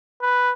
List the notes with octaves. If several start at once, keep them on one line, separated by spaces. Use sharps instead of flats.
B4